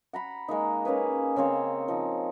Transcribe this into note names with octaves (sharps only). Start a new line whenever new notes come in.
F#5 A#5 B5
G#3 A#3 D#4
A#3 C#4 G#4 B4
C#3 C4 C5 C#5
F3 D#4